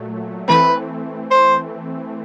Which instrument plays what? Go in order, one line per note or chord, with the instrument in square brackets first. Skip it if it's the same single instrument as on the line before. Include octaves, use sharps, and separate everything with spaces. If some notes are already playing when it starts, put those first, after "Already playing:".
Already playing: [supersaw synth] A#2 F#3 A3
[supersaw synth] E3 A3 C4 [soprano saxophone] B4
[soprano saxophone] C5